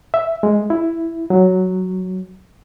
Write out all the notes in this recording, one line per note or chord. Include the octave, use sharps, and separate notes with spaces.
E5
G#3
E4
F#3